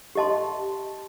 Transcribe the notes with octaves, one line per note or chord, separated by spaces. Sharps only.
G4 D#5 A5 C6